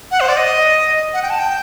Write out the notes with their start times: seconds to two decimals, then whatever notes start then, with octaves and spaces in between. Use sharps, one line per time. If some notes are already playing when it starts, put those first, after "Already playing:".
0.11 F#5
0.21 C5
0.29 D5
0.37 D#5
1.14 F#5
1.23 G5
1.30 A5
1.39 G5